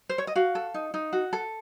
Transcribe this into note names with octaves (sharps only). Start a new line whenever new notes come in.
C5
C#5
D#5
F#4 F5
A4
D#4
D#4
F#4
A4